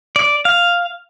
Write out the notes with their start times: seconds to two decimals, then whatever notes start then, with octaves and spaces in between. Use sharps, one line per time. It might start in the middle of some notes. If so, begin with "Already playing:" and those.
0.16 D5
0.45 F5